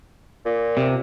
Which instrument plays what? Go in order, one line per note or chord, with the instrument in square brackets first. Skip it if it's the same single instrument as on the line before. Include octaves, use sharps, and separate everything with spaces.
[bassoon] A#2
[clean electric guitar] C3